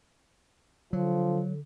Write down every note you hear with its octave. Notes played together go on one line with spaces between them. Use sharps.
D3 F3 F#3